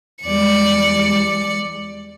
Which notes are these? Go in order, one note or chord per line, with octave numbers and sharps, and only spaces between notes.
E2 G3 G#3 D5 C#7